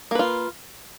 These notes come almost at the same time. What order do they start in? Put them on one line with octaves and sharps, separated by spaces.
A#3 B4 F4